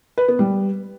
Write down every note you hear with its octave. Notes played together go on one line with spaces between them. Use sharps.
B4
B3
G3